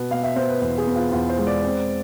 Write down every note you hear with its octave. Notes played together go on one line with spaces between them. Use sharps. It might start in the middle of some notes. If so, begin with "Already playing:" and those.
Already playing: B2 B3
B2 F5
E5
B3 C5
B4
E2
G#4
B3
F4
E2 F4
C5
G#3
D5
C4